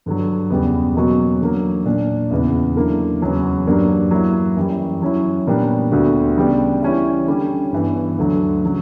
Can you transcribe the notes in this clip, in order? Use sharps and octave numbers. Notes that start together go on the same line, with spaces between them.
G2 D3 F#3
E2 C#3 G3 B3
B2 F#3 A#3 C#4 F#4
D3 F#3 A#3
A#2 A#3 D4
E2 C#3 E3 B3
D3 F#3 A#3 E4 A#4
E2 C#3 F#3 C#4
G2 F#3 A#3 D4 G4
F#3 A#3 E4
F#2 E3 G3
F#3 C#4 E4
A#2 G3 B3 D4 A#4
D2 D3 G3 B3 F#4
C#3 G3 B3 D4 G4
E3 G3 C#4 E4
D3 G3 C#4 G4
G2 E3 B3
D2 D3 F#3
C#3 F#3